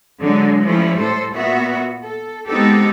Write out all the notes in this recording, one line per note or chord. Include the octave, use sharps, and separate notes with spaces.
D3 F#3 G#3
F3 G3 A3 C#4 E4
A2 A4 C5
A#2 B3 F#4 E5
A4
G#3 B3 C4 D#4 G4 A4